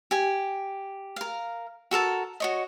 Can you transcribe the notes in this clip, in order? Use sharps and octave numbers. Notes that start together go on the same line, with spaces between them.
G4 G#5
A#4 F5
F#4 A4 A#4 A5
F#4 C#5 D#5